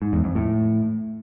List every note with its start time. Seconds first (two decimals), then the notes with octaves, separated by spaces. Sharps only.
0.02 G#2
0.13 E2
0.24 F2
0.35 A2